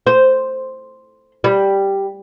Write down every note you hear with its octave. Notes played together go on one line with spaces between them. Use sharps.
C5
G3